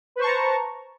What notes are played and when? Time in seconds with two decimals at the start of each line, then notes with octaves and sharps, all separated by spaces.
0.16 B4
0.18 C5
0.21 C#6
0.23 A5
0.26 A#5